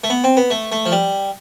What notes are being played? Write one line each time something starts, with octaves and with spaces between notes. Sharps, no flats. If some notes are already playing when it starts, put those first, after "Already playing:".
A3
B3
C4
B3
A3
A3
F3
G3